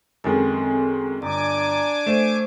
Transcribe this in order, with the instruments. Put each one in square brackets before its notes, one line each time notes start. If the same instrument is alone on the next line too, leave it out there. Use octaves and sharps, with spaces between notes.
[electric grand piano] F#2 D#3 G#3 [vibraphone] C4 A4 G#5
[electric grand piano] G1 [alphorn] D4 [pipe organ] G#5 D6 [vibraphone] A#5
[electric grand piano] A3 E7 [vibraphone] C5